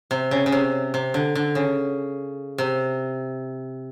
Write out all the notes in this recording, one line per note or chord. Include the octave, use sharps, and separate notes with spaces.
C3
C#3
C#3
C3
C3
D3
D3
C#3
C3